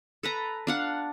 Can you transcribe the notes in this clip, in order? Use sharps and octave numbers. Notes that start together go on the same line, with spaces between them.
A4 B4 A#5
D4 F5 F#5